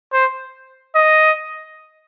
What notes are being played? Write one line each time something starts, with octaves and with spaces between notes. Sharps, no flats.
C5
D#5